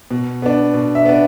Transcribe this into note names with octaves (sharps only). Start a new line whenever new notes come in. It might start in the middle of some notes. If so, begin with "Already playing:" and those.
B2
B3 D4
B2
E5
B3 D4